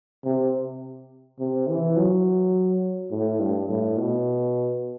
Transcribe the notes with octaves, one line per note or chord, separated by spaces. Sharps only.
C3
C3
E3
F#3
A2
G2
A2
B2